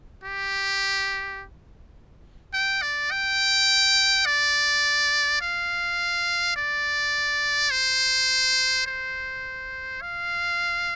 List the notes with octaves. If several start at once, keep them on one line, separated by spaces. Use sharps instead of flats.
G4
G5
D5
G5
D5
F5
D5
C5
C5
F5